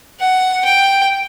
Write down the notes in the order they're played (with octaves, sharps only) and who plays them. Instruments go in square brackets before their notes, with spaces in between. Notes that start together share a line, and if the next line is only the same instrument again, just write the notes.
[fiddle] F#5
G5